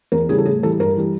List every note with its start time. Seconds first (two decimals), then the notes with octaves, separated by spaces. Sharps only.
0.12 E2 A#4
0.29 C#3 E3 G3 G#4
0.38 A4
0.45 A2 G#4
0.63 E3 G3 A4
0.80 G2 A#4
0.96 E3 G3